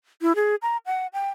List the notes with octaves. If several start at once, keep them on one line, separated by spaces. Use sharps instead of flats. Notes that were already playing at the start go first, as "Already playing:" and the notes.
E4
G#4
A#5
F#5
G5